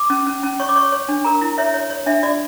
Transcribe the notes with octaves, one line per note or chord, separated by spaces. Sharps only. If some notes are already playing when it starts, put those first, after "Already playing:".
Already playing: D6
C#4
C#4
C#4
C#5 C#6
D6
C#5 C#6
C#5
D4
A#4 A#5
E4
C#5 E5
C#5
C#5
D4 E5
F4 D5